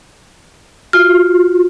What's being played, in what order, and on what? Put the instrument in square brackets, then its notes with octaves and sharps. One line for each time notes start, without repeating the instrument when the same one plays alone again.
[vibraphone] F4 F#4 [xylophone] F6